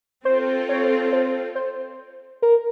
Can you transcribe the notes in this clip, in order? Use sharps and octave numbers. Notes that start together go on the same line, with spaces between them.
C4 F4 A4 C5
C#5
C5
C5
A#4